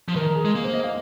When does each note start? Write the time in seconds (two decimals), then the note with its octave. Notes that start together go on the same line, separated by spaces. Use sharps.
0.09 F3
0.16 D#3 A#4
0.35 G#4
0.45 G#3
0.55 A#3
0.64 C5
0.73 D#5
0.84 F5